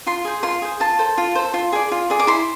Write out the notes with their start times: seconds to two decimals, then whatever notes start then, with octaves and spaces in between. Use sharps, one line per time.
0.07 F4 C6
0.25 G#4 C5
0.43 F4 C6
0.62 G#4 C5
0.80 F4 A5
0.99 A4 C5
1.18 F4
1.35 A4 C5
1.54 F4
1.73 G#4 D5
1.91 F4
2.10 G#4 D5
2.20 D6
2.27 E4 C6